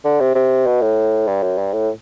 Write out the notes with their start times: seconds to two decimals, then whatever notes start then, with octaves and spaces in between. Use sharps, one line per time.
0.05 D3
0.20 C3
0.35 C3
0.67 B2
0.82 A2
1.27 G2
1.43 F#2
1.58 G2
1.74 A2